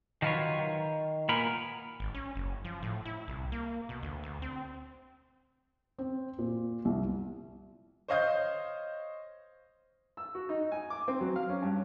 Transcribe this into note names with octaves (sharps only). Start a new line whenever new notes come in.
D#3 F#3 F4 A#4 B4 C#5
D#3
A#2 B3 A#4 B5
G#1
C#4
F#1
F3
A2
E4
C2
A#3
B2
D2
D2
C4
C4
A#2
C2
C5 C#5 D#5 F5 D#6 G6
E6
F#4
D#4
G#5
D6
C4
F#3
F5
C#4
G2